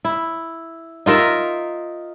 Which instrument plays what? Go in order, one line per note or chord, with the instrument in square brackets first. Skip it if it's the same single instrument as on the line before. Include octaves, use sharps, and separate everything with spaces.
[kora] E4
D#4 F4 A#4 E5